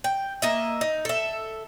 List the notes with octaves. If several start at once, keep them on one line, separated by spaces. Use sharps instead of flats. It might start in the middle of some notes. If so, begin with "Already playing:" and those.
G5
A#3 D#5 E5
D#4
A4 E5